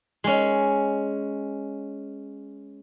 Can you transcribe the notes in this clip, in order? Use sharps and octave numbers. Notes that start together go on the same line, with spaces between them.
G#3 C#4